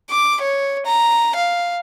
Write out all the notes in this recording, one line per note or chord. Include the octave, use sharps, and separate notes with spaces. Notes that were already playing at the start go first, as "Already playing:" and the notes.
D6
C#5
A#5
F5